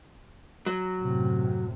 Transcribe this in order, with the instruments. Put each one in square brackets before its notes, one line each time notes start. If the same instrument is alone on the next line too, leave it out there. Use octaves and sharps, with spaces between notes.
[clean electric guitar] F#3
[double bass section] F#2 A2 C3